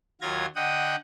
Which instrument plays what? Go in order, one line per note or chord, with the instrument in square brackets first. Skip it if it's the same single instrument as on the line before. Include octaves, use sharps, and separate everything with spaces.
[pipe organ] D#2 F#3 F4 G#6 A#6
D3 D#5 F#5 G5 D#6